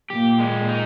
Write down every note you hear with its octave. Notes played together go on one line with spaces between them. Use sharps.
A#2 G4
G#3
D#4